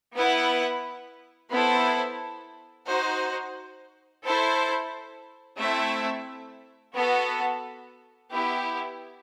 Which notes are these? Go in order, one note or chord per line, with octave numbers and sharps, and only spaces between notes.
B3 E4 B4 F#5
B3 E4 A4 C5
D#4 F#4 C5
E4 A4 C5
A3 C4 E4 A4 E5
B3 F#4 A4
B3 E4 G4